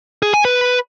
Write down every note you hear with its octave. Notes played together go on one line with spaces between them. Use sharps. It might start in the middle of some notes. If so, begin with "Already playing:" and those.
G#4
G#5
B4